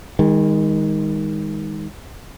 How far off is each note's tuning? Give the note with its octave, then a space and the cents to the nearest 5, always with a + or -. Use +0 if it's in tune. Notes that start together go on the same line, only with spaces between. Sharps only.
D#3 +10 G#3 -35